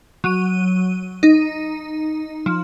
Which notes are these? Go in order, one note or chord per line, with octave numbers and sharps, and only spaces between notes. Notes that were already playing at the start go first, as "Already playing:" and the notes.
F#3 D#7
D#4
F3